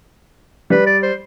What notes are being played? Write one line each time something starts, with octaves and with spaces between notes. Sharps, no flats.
G3 B4
D5
C5